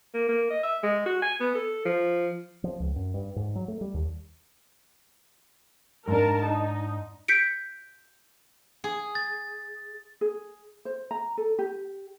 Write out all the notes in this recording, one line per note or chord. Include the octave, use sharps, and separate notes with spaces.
A#3
A#3
D#5
E5
G#3
F#4
G#5
B3
A4
F3
F3
C#2
F#2
G2
G#2
F#3
A3
G3
D#2
G#2 D4 A#4 A5
D#4
G6 B6 C#7 D7
G#4
A6
G#4
C5
A#5
A4
G4